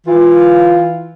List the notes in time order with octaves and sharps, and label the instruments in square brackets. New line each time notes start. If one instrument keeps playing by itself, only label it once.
[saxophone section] E3 F4